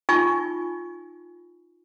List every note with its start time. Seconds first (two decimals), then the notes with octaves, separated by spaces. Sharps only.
0.09 D#4 F4 G#5 C#6